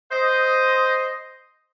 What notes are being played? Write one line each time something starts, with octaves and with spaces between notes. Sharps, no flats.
C5 D#5